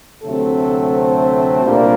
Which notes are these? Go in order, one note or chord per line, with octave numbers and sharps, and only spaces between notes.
D2 C3 F#3 A3 C4 A4
C5
C2 A#2 G3 A#3 D4